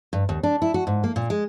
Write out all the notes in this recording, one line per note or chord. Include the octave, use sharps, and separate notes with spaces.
G2
D#2
D4
E4
F#4
G#2
A#3
A#2
G#3